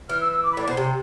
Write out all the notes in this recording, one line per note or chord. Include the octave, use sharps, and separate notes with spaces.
E3 F6
E6
E6
D6
B5
A2 D5
B2 C5
C3